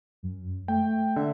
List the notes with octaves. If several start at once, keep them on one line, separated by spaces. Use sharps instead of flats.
F#2
A3 G5
D3 E5